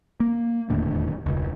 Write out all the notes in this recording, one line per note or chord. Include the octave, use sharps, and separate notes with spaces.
A#3
E1 D#2 A2 D3
E1 C#2